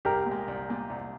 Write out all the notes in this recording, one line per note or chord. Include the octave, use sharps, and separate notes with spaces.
C2 G4 A#4
A#2
G#3
C2
A#2 G#3
C2